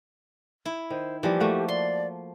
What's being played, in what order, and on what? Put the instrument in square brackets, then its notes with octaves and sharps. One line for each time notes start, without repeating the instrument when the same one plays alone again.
[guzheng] E4
[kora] D#3 [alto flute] C5
[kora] E3 G3 A#3 [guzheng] F3 [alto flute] G4
[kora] A3 A#3 F#4
[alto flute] D5 [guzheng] C6